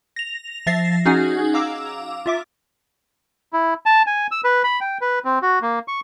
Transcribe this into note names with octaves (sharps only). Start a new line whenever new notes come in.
A#6 F7
F3 E5 A6 A#6 C7
C#4 D#4 F#4 G#4 F#5 G#5
F5 A#5 D6 E6
F4 E5 D6
E4
A5
G#5
E6
B4
B5
G5
B4
C4
F#4
A#3
C#6